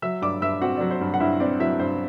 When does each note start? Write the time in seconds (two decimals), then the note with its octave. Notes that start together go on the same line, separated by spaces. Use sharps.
0.02 F#3 E5 E6
0.22 G2 D5 D6
0.41 G2 E5 E6
0.61 C4 F#4 F#5
0.77 F#3 D5
0.91 C5
1.01 G2
1.14 F#5
1.20 G2 E4 E5
1.40 C4 D5
1.60 F#3 E4 E5
1.79 G2 C5